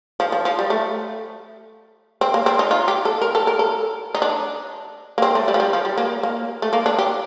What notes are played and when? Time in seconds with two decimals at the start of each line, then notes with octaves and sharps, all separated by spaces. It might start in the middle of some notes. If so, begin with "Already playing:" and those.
0.20 F3
0.32 F3
0.45 F3
0.59 G3
0.70 A3
2.21 C4
2.34 A#3
2.46 C4
2.59 D#4
2.71 F4
2.88 G4
3.05 A4
3.22 A#4
3.35 A4
3.47 A#4
3.59 A4
4.15 D#4
4.22 D4
5.18 A#3
5.22 C4
5.35 A3
5.48 G3
5.54 F3
5.60 G3
5.73 F3
5.85 G3
5.98 A#3
6.23 A#3
6.62 A3
6.73 A#3
6.86 D4
6.98 G4